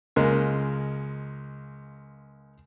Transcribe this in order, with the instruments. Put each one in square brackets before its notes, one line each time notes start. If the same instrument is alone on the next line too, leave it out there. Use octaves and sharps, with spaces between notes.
[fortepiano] C#2 G#3 A#3 A#4